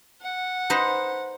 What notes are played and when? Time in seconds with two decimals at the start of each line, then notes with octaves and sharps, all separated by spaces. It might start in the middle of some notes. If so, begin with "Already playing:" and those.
0.21 F#5
0.70 D#4 B4 C5